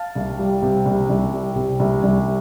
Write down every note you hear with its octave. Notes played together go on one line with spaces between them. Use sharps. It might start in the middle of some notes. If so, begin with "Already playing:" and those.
Already playing: F5 A5
C2
G3
C3
C2
C2
G3
C3
C2
C2